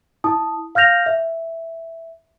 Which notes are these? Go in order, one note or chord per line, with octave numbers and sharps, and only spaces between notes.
E4 A5 D#6
F5 F6 G6 A#6 F7
E5